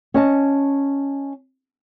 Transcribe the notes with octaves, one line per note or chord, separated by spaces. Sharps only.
C#4 D#5 A5